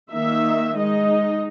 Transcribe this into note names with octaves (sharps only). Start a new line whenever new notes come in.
D#3 A#3 D#4 E5
G#3 D#4 D#5